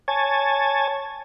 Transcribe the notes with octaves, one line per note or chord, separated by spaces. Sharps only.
C#5 G#5 A5